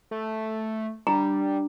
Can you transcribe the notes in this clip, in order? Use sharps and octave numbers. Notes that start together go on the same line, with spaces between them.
A3
G3 D4 A#5